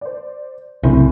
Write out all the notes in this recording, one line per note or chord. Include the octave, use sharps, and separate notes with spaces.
C5 D5
C2 F#2 A2 C#3 C4